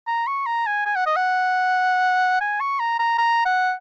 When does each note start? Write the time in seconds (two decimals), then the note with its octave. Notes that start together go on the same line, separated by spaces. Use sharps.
0.07 A#5
0.27 C#6
0.46 A#5
0.66 G#5
0.85 G#5
0.96 F#5
1.06 D#5
1.16 F#5
2.41 G#5
2.60 C#6
2.80 A#5
2.99 A#5
3.18 A#5
3.45 F#5